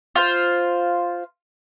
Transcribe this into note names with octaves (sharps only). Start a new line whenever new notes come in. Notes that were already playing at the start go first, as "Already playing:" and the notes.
F4 C5